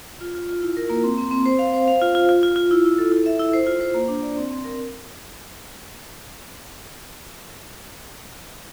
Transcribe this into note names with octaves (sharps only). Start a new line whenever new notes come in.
F4
F4
F4
E4
A#4
A#3
C4
C4
C4
C5
F5
C5
F5
F4
F4
F4
F4
F4
E4
E4
A4
E4
E5
E4
C5
F4
C5
A#3
D4
D5
C4
C4
A#4